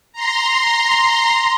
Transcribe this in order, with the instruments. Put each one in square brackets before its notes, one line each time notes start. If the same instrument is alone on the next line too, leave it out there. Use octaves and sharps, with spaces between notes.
[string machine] A#5 C6